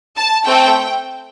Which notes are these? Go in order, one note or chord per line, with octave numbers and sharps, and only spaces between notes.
A5
A3 C4 A4 G5